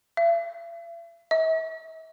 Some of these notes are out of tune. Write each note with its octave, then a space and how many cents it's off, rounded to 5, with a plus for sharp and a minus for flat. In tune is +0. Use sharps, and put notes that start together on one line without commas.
E5 +45
E5 -40